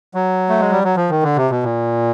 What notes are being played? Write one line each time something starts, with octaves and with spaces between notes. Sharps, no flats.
F#3
A3
G#3
G3
F#3
F3
D#3
D3
C3
B2
A#2